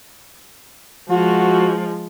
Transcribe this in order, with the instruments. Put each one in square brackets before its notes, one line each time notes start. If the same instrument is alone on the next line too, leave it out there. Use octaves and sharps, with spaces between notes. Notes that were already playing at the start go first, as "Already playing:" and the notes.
[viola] F3 G#3 [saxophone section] F#4